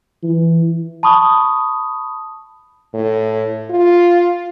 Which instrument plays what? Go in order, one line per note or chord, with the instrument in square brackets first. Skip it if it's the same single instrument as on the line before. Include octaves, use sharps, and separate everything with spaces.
[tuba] E3
[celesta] A5 B5 C#6 D#6
[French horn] A2
F4